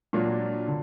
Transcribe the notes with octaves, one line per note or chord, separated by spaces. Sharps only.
A#2 F#3 A#3 D4 F4
D3